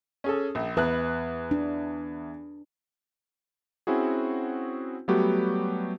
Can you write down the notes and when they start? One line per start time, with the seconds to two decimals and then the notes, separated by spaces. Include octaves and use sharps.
0.24 C#4 G#4 A4
0.55 A#1
0.77 E2 B4 F#6
1.51 D4
3.87 C4 C#4 E4 F#4 G#4
5.08 F#3 G3 A3 B3 F#4 G4